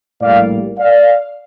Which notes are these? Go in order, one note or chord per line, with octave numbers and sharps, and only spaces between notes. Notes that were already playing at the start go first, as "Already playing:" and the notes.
A#1 A2 G3 A#3 D5 F5
D5 F5